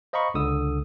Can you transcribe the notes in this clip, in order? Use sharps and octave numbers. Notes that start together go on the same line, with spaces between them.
C5 D#5 F5 A#5 B5 C#6
C#2 D3 D#6 E6